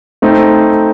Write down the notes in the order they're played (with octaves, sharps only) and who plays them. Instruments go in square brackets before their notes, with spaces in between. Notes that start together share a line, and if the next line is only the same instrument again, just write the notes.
[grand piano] A3 C4 D#4